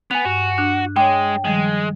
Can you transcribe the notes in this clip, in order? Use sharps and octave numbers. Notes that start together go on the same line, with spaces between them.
B3 G#5 F7
G2 F#4
D4 F#6
G#3 C#5 G5 D6
D#3 F3 G3 G#3